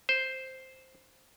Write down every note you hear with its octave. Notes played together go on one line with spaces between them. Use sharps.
C5